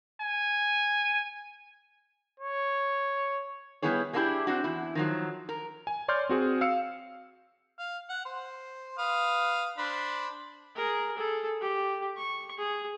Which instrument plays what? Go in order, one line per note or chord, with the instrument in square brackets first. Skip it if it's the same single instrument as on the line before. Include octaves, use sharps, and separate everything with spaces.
[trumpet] G#5
[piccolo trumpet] C#5
[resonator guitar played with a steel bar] G3 G#3 B3 E4 G#4 C#5
G#3 A#3 D4 E4 G4 G#4
C4 D4 F#4
E2 E4
D#3 F3 F#3
A#4
[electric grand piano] G#5
C#5 D5 C6 F6 G6
C4 F#4 G#4
F5 E6 C#7
[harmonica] F5
F#5
C5
B4 F5 D#6
D4 C5 B5
[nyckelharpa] G#4 A#4
G#4 A4
G4
C#6
G#4